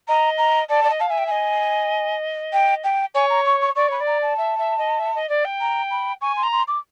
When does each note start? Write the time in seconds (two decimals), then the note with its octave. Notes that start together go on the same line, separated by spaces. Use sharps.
0.08 D#5 A#5
0.38 A#5
0.69 D5 A5
0.84 D5
0.90 D#5
1.00 F5 A5
1.09 E5 G#5
1.18 G5
1.27 D#5 G#5
2.53 G5
2.84 G5
3.14 C#5 G#5
3.30 A#5
3.45 C#6
3.61 C#6
3.76 D5 C#6
3.88 C#5 B5
4.00 D5
4.07 A#5
4.22 A5
4.38 E5
4.58 E5
4.78 D#5
4.99 E5
5.15 D#5
5.29 D5
5.45 G5
5.61 A#5
5.91 B5
6.21 G#5 C#6
6.37 C6
6.43 A#5
6.52 C6
6.68 D6